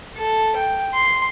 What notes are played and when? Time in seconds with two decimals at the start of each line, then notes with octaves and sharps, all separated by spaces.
0.16 A4
0.56 G5
0.94 C6